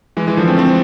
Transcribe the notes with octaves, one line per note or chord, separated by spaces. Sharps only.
E3 G#3
E3 G#3
D3 F3
A3 C4
A3 C4